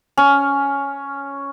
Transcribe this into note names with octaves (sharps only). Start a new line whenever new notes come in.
C#4